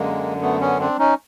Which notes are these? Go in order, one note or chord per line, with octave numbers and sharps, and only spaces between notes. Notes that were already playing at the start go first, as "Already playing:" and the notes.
Already playing: F#2 D3 G#3 A#3
A3 B3
B3 C#4
C4 D4
C#4 D#4